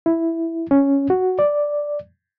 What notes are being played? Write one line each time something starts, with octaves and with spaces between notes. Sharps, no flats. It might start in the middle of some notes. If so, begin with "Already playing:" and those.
E4
C#4
F#4
D5